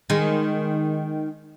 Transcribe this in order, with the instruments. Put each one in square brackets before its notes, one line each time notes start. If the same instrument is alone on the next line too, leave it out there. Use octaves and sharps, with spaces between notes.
[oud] D#3 G#3